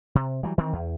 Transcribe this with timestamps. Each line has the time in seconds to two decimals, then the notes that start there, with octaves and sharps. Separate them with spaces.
0.15 C3
0.43 E3 F#3 G3
0.58 D#3 E3 C4
0.73 E2